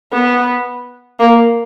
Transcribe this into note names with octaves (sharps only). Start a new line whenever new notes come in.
B3
A#3